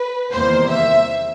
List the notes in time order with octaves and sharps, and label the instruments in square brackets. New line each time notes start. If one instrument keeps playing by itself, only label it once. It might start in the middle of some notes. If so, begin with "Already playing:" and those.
Already playing: [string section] B4
E2 C3 D#3 G3 A#3 C5
E5